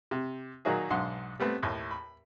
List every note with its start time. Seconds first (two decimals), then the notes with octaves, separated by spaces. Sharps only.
0.11 C3
0.65 A#2 D#3 F#3 D#4 F#4 G#4
0.90 B1 G#2 D3 F#5 C6
1.40 G3 A3 B3 C4
1.63 D#2 A2
1.91 B5